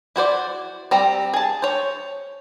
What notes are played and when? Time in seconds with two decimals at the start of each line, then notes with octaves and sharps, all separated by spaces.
0.16 E4 F#4 C5 D5
0.91 G3 C4 A#5
1.34 G#4 A5
1.62 C5 C#5